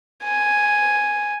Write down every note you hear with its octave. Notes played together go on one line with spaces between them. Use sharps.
G#5